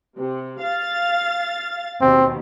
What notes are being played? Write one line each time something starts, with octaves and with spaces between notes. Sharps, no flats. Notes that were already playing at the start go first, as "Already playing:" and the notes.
C3
F5 A6
D#2 B2 C4